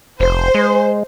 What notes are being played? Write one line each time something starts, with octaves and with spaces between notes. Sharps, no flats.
F1 C5
G#3